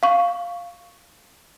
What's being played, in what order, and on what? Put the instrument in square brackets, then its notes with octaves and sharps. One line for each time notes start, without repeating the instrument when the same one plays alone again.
[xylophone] F5 C#6